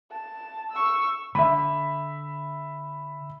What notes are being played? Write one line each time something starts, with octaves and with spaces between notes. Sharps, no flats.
A5
C#6 E6
D3 E5 B5